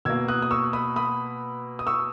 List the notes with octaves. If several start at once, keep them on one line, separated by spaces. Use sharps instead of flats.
B2 A#3 E6 G#6
D#6 F#6
D#6
C#6 E6
B5 D#6
B5 D#6
D#6
C#6 E6